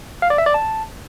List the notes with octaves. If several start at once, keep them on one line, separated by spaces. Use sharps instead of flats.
F5
D5
E5
D5
A5